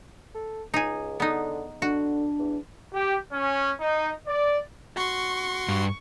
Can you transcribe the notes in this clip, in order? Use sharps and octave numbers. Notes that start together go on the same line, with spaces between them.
A4
C#2 D#4 G#4
D3 B3 D#4
D3 D4 F#4
E2
G4
C#4
D#4
D5
F#4 C6 C#6
G2